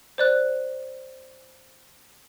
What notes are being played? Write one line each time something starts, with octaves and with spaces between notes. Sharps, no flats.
C5 D5 F#6